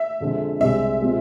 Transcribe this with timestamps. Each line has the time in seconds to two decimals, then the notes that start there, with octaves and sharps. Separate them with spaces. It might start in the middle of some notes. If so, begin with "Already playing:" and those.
Already playing: E5
0.20 F2 D3 G#3
0.60 C2 C3 G#3 E5
1.01 B2 G#3 C4 F4